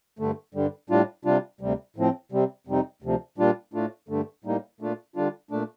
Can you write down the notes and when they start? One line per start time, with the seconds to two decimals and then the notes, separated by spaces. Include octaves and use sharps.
0.19 G2 D3 A3
0.54 G2 D3 G3
0.90 A2 G3 D4 F4
1.25 C3 G3 D4 F4
1.61 D2 C3 G3
1.96 A2 F3 C4
2.32 C3 G3 C4
2.67 F2 C3 G3 C4 D#4
3.02 D2 C3 F3
3.38 A#2 G3 D4 F4
3.74 A2 A3 D4 F4
4.09 G2 D3 A3
4.44 A2 G3 A#3 D#4
4.80 A#2 A3 D4 F4
5.16 D3 G3 D4 F4
5.51 A#2 A3 D4